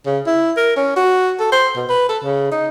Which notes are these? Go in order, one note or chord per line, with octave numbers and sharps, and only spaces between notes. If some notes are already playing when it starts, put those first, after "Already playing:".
C#3
E4
A#4
C#4
F#4
A4
C5
B2
B4
A4
C#3
D#4